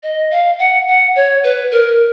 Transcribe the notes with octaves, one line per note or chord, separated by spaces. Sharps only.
D#5
F5
F#5
F#5
C#5
B4
A#4